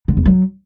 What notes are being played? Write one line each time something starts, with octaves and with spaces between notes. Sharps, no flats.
D3
E2
F#3